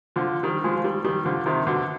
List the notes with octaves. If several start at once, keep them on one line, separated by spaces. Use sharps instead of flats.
D3 F3
D#3 G3
F3 G#3
F3
D#3 G3
D#3 G3
D3 F3
C3 D#3
B2 D3